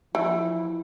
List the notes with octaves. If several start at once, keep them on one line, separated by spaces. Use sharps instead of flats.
E3 F3 E4